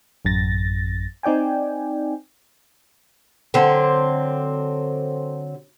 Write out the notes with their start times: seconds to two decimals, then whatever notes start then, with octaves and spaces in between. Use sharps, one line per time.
0.25 A1 F#2 A6 A#6
1.23 C4 D#4 D5 G5 G#5
3.54 D3 F#3 C4